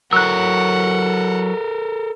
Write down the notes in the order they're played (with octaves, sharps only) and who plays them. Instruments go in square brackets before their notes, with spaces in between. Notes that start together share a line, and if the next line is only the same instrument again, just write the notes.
[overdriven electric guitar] F#3 E4 [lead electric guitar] A4 A#4 [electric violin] F#5 [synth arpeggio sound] E6 F#6